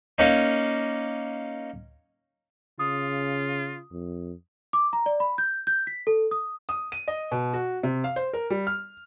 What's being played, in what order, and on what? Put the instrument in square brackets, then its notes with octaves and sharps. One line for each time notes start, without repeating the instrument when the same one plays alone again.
[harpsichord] A#3 C#4 D#4
[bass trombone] C#3 [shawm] F4 [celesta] D#6
[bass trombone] F2
[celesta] D6
A#5
D5
B5
G6
G6
B6
A4
D#6
[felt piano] D#6
D#7
D#5
B2
F#4
C3
F5
C5
A#4
G3
F6